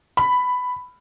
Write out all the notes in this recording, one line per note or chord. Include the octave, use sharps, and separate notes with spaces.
B5